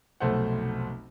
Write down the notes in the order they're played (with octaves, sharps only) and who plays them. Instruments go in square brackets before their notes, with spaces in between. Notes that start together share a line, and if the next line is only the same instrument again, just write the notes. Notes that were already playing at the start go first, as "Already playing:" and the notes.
[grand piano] F1 B1 A3 C5 F#5